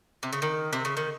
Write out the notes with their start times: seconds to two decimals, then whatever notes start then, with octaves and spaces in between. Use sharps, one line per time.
0.23 C3
0.33 C#3
0.42 D#3
0.73 C3
0.85 C#3
0.97 D#3